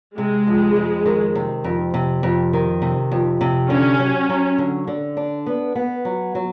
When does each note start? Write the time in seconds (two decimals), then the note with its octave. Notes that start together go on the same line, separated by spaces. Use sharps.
0.17 C3 G#3
0.47 F2
0.77 F2
1.06 D#3
1.35 C3
1.64 F2
1.94 C3
2.23 F2
2.53 D#3
2.82 C3
3.12 F2
3.41 C3
3.70 D3 C#4
4.00 F#3
4.29 F#3
4.58 D3
4.87 D3
5.17 D4
5.46 B3
5.75 B3
6.05 F#3
6.35 F#3